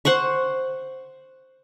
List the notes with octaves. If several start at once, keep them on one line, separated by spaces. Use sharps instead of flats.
C5 F#5 C6 C#6